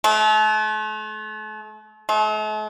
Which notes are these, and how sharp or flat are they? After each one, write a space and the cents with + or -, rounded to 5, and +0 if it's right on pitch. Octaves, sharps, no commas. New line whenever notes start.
A3 -40
A3 -45